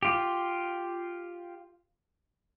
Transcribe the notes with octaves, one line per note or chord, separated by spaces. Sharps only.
F4 G4